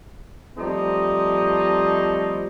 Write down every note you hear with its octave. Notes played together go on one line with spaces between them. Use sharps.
F3 G3 A3 C4 D#4